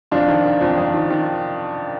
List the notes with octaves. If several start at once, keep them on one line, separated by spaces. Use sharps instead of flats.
F2 D4 F4
D#3
D#3
F2
F2
D#3
D#3